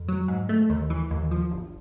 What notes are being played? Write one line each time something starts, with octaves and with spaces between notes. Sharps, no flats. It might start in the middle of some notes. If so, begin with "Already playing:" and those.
Already playing: F2
F#3
G#2
A3
D#2
E3
D#2
F3
G1